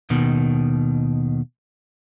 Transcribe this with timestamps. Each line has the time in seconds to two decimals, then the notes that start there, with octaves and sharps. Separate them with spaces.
0.10 D#2 B2 D#3